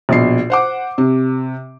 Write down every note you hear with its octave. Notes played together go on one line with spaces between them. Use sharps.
A#1 B2 C7
C5 F#5 D6
C3